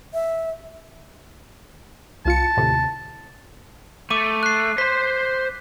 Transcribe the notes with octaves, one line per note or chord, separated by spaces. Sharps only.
E5
C2 F4 A5 C#7
D#2 A2 C3
A3 D6 D#7
F#6 C7
C5 C6 B6